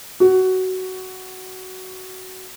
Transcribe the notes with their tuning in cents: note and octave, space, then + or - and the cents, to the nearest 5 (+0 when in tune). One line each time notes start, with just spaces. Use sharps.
F#4 +15